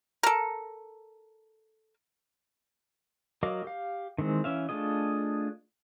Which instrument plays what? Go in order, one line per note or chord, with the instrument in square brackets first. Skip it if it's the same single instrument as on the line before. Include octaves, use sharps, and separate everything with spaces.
[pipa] A4 A#4
[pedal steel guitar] F#3 A#4 D#5 F5 D6
G4 F5
D#3 E3 G#3 C4
E3 C#4 E5 F5
A3 D4 F4 G#4 D#5